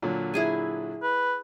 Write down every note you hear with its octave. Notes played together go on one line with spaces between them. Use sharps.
A#2 D3 F#3
E4 G#4 G#5
B4